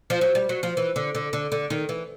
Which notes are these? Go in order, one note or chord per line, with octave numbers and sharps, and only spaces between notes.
F3
F#3
G3
F#3
F3
E3
D3
D3
D3
D3
D#3
E3